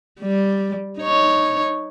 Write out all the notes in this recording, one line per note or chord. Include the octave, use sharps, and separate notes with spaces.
G3
D#4 C#5